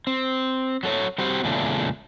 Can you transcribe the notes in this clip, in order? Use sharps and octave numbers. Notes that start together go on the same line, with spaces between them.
C4
F#3 A4 C#5
G3 C4 F#4 G4 C5
E2 A#2 C#3 G#3 A3 D4